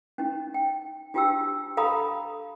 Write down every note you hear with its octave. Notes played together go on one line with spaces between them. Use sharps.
C#4 D#4
G5
D4 F4 G4 G5 A5 E6
A4 F5 A#5 B5 D#6